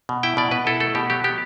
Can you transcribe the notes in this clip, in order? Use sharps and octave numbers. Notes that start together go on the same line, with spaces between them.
B2
E4 G5
B2 D5
B2 B4
E4 A4
A3 A4
B2 G4
F#3 G4
B3 G4